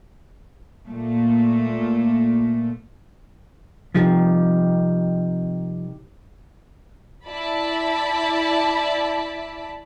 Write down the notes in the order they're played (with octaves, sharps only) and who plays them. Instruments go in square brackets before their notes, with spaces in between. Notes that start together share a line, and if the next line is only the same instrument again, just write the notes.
[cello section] A#2 A3
[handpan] C3 D#4 G4 [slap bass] F3
[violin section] E4 D5 A5 B5